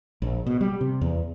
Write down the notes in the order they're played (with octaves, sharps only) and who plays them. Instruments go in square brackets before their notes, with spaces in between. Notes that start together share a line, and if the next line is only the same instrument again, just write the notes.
[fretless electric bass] A#1
B2
G3
C3
E2